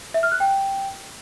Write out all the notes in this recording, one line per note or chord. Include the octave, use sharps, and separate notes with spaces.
E5
F6
F#6
G5